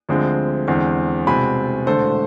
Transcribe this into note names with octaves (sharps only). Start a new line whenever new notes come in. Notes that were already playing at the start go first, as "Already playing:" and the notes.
D2 D3 F3 G#3 C4
E2 D3 G#3 C4
C2 B2 G#3 C4 G#5 B5
E1 D2 D3 A3 A4 C5